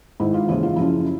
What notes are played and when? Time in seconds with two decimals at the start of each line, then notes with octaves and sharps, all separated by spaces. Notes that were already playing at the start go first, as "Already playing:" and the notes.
0.20 G#2 D#3 E4
0.34 F4
0.49 D#2 C#3 E3 E4
0.63 F4
0.76 F#2 C#3 F3 E4